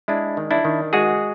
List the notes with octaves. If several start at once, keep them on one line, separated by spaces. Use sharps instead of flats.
G#3 D4 E4
D#3
D4 E4
D#3
G#3 F#4 G#4